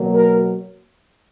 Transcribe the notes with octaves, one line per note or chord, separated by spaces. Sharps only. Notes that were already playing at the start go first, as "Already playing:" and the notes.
Already playing: B2 F#3 A#3
A#4